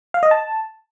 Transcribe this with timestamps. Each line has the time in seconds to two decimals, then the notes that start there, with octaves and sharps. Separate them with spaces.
0.14 F5
0.23 D#5
0.31 A5